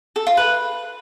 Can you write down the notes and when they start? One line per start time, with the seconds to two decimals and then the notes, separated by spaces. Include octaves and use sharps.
0.16 A4
0.27 F4
0.37 B4